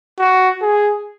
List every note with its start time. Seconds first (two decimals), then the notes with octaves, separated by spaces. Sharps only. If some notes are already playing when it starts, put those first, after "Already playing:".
0.19 F#4
0.62 G#4